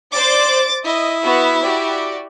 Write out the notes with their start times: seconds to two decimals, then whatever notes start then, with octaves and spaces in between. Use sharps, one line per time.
0.12 C5 D5 D6 A6
0.85 E4 D#5
1.23 B3 F#4
1.62 F#4 G4 D5